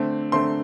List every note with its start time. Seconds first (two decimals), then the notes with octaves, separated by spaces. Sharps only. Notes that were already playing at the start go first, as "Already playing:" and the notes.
Already playing: D3 A3 C4
0.32 D3 A3 C4 C6